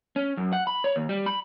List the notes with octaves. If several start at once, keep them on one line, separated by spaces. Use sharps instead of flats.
C#4
F#2
F#5
B5
C#5
D#2
G3
B5